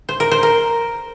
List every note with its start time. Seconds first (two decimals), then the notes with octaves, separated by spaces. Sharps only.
0.09 C5
0.20 A#4
0.31 C5
0.43 A#4